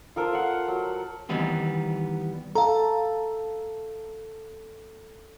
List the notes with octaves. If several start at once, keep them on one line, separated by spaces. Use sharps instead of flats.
F4 A4 A#4 C5
F5 F#5
F#3
D#3 E3 G3 B3 C4
A4 F5 A#5